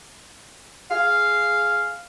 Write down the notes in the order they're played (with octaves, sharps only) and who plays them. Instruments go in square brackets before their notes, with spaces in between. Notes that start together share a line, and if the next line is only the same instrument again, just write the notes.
[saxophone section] G#4 F5